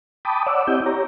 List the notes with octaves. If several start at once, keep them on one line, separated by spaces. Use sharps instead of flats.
G5 A5 B5 D6 D#6
C#5 D5 F#5 D6 E6
C4 E4 G4 D#5 G6
G4 C#5 A#5